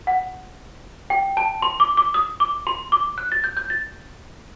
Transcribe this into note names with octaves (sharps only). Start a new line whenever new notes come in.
F#5
G5
A5
C6
D6
D6
D#6
D6
C6
D6
F#6
A6
G6
G6
A6